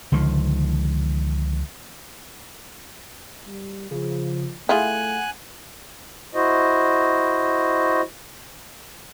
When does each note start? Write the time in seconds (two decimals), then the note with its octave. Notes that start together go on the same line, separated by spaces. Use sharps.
0.12 C#2 D3 D#3 F3
3.47 G3
3.91 C#3 F3
4.69 A3 E4 F4 G#4 F#5 G#5 F#6
6.35 E4 F#4 C5 D#5